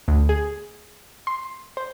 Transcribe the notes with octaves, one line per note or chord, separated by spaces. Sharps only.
D2
G#4
C6
C5